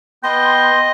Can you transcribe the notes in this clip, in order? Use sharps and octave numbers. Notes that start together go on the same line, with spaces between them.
B3 D#5 G5 C6